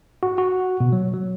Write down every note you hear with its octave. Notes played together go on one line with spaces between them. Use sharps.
F#4
F#4
B2
F#3
F#3